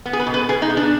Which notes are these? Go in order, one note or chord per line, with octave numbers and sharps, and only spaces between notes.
B3
G#4
B4
B2
B4
B2 G#4
D#4
B3
D4